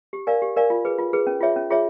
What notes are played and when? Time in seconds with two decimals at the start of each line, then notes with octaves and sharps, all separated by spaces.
0.13 G4
0.27 A#4 D5 F5 G#5
0.42 G4
0.56 A#4 D5 F5 G#5
0.70 F4
0.85 G#4 B4
0.99 F4
1.13 G#4 B4
1.27 C#4
1.41 F4 G#4 C#5 E5
1.56 C#4
1.70 F4 G#4 C#5 E5